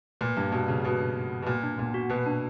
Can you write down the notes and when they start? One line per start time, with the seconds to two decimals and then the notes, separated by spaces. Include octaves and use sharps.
0.21 A#2 B4
0.37 G2 D4
0.52 B2 B3
0.68 C#3 F#4
0.83 B2 B4
1.00 D4
1.16 B3
1.31 F#4
1.42 B2
1.46 A#2 B4
1.63 D4
1.78 A#2 B3
1.94 F#4
2.09 B2 B4
2.26 D4